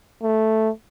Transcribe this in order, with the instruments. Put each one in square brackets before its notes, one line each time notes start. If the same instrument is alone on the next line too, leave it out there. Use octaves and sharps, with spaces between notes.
[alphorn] A3